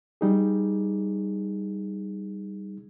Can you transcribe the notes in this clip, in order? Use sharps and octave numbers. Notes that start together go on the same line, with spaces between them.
G3 D#4 G#4